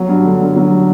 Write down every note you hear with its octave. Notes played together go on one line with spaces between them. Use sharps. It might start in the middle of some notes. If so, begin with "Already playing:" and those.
Already playing: F#3
G2
D3
G2
F#3